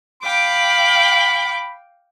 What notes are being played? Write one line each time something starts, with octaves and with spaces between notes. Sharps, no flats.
F5 G5 B5 D6